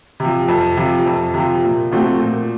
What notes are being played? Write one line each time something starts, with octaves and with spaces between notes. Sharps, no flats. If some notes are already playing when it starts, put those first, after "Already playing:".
C3 F3
F2
C3 F3
F2
C3 F3
A#2
F3 A3 C4 F#4
A#2